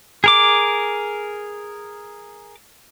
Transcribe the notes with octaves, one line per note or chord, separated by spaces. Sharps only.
G#4 A#4 D6